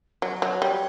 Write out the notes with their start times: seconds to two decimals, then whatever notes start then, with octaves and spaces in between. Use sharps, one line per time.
0.22 F#3 D5
0.34 C#5
0.42 F#3 B4
0.59 D5
0.62 G3 C#5